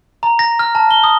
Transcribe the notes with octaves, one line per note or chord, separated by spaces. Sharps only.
A#5
A#6
F6
A5
G7
D#6